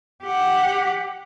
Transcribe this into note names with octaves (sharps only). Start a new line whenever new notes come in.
G4 F#5